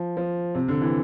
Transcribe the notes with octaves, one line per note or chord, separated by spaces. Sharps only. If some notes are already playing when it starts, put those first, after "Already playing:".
Already playing: F3
F3
C3
D3
E3